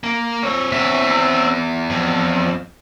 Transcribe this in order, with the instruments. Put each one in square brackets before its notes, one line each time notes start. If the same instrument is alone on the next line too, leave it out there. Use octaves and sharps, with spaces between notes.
[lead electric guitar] A#3
C4 C#5
[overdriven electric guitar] E2 E5
[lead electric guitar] F2